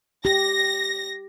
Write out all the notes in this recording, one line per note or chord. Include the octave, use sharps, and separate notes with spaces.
G4 A#6